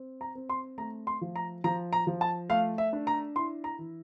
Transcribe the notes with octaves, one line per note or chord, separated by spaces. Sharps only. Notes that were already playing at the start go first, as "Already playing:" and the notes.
Already playing: C4
A#5
C4
C6
A3 A#5
C6
F3
A#5
F3 A#5
A#5
F3
A5
A3 F5
E5
D4
A#5
E4 C6
A#5
E3